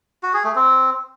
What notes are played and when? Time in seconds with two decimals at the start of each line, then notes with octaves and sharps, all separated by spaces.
0.23 F#4
0.34 G#4
0.44 A3
0.55 C4